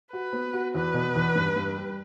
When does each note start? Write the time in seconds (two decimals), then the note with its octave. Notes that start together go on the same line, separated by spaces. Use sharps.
0.12 F#4 B4
0.32 B3
0.53 F#4
0.74 E2 B4
0.94 B2
1.15 E2
1.35 G2
1.56 G2
1.76 G3